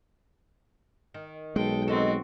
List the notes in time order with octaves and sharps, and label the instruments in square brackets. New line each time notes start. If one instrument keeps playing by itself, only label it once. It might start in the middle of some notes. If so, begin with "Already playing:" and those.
[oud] D#3
[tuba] B1 [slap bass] G#3 [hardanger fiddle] A4 G5
[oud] D#3 D#4 A4 [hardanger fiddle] C4 F#4